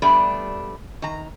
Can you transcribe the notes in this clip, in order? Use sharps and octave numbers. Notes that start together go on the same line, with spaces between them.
G3 A3 B3 D4 G4
D#3 A#5